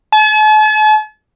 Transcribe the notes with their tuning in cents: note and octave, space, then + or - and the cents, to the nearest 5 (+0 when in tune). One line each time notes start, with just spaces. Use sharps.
A5 -45